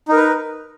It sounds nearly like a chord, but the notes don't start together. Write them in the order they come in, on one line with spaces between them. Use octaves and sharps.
D#4 A#4 B4